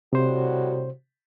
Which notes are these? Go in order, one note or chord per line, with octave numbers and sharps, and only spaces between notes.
A2 C3 G3 F#4 C5